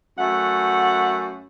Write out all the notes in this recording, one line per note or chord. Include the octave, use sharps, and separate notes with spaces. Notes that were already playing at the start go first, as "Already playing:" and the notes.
F#2 A3 F#5